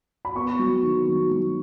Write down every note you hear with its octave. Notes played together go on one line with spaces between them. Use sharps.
B5
B3 C#6
F#3
D#3
F#3
F#3